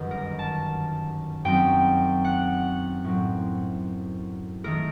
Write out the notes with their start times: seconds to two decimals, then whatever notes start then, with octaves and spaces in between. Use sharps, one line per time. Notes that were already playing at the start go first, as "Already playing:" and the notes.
Already playing: G1 F#2 D#3
0.11 A#4
0.39 A5
1.45 F#2 F#3 C4 D#4 G5
2.25 F#5
3.04 A2 F#3 C4
4.64 D#3 A3 A#4